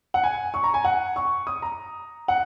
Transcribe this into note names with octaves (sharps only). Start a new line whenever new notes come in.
F#5
G#5
C#6
A#5
G#5
F#5
C#6
D#6
A#5
F#5